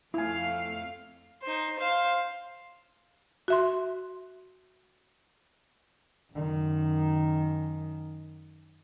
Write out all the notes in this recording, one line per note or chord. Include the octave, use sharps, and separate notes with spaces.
F2 A3 E4 F5 G#5
D#4 C5
C5 F5
F#4 E5 C6
F#2 D#3